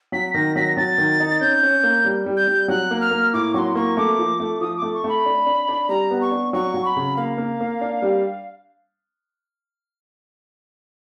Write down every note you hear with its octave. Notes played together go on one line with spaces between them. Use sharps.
F#3 B6
D#3 A#6
F#3 B6
A#6
F#3 A6
D#3
D#4
C#4 G6
C#4
A#3
G3
G3
G6
G3
F#3 F#6
A#3
F6
A#3
A2 D6
F#3 C6 C#6
A#3 C#6
A3 D6
F3
A3
F3 D#6
D6
A3
C#6
A3 B5
D4
D4
D4
G3 A#5
B3
C#6
D4
F#3 C#6
F#3
B5
C#3
A#3 F5
A#3
A#3
D4
G3